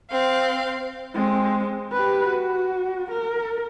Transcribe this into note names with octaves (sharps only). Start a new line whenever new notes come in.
C4 F5
G#3 C4
G4 B4
F#4
A#4